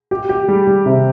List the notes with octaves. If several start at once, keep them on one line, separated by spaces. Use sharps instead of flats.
G4
G4
G3
G3
C3